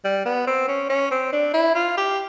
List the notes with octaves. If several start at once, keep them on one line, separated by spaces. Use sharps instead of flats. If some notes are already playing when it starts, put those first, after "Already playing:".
G3
B3
C4
C#4
C#4
C4
D4
E4
F4
G4